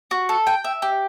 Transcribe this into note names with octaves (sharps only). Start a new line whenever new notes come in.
F#4
A4
G5
E5
G4